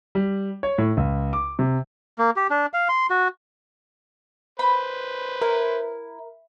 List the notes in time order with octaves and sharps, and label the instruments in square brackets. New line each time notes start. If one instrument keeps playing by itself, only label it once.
[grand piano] G3
C#5
A2
C#2
D6
C3
[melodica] A#3
G4
D4
F5
C6
F#4
[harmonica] B4 C5 [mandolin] B5
[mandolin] E4 [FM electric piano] A#4